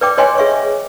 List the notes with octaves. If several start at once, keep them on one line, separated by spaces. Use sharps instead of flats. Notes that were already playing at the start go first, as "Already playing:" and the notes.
B4 D5 G5 D6
B4 C#5 D#5 G5 G#5 C6
G#4 E5 C#6